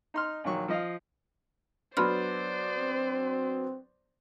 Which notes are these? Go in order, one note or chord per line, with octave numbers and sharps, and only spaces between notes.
D#4 C6 F6
A#1 D#3 F#3 C#6
F3 D#5 F5
F#3 B3 D4 C5 D5 B5 C6 F6
C4